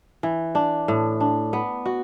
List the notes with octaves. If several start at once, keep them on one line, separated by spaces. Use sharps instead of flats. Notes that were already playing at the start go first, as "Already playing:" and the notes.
E3
D4
A2
D4
B3
F#4